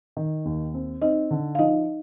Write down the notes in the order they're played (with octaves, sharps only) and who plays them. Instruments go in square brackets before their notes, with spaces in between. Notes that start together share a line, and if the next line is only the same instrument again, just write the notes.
[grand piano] D#3
D#2
C4
[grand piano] C4 [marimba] D#4 D#5
[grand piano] D3
[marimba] F5
[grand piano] F3 [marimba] D#4 D#5